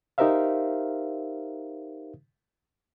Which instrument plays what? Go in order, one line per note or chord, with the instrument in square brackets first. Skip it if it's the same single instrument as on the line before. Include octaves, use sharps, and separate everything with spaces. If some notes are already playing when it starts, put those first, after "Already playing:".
[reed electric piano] D#4 G4 A#4 C5 E5 F5